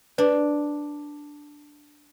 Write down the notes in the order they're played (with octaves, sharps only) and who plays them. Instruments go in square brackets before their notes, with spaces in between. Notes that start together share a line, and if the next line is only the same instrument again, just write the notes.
[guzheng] D4 [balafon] B4 D5